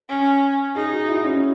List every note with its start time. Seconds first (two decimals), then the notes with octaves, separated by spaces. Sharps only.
0.09 C#4
0.75 D#4 G#4
0.92 F#4
1.08 E4
1.24 C#4